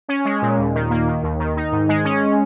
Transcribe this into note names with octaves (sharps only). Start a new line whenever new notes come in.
C#4
G#3
A#2
D#2
D#3
A#3
D#3
D#2
D#3
D#4
G#2
G#3
C#4